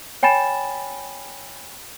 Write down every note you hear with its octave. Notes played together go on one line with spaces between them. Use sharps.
C#5 G5 G#5 B5 A6 E7